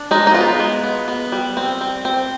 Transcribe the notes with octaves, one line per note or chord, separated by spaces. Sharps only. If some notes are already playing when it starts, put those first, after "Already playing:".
Already playing: D4
G#3 D#4
D#4
B3 F4
G#3
B3
B3
G3
C4
C4
C4